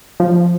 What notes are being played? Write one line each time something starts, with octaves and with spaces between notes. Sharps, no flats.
F3